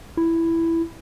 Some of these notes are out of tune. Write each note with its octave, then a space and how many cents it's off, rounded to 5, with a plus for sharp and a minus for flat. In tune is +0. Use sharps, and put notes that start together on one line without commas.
E4 +5